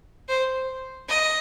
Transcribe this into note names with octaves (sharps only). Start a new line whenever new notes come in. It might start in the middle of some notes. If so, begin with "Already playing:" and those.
C5
D#5